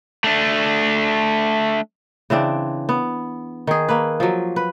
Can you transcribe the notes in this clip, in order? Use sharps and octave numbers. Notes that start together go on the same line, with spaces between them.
A3 D4
C#3 E3 C4 D4
B3
D#3 G#4
A#3 B4
F3 F#3
B4